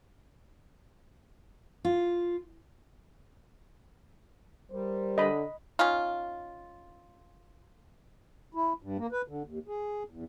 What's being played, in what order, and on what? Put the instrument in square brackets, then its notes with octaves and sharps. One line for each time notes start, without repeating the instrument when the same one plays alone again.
[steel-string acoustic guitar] F4
[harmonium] G3 [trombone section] A#4 C5
[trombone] D3 [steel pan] D#5 B5
[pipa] C#4 D#4 F4
[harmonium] E4
G2
A#3
B4
D3
D#2
G#4
E2